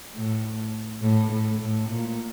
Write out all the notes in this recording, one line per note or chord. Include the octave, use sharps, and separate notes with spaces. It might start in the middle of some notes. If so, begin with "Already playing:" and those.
A2
A2
A2
A2
A#2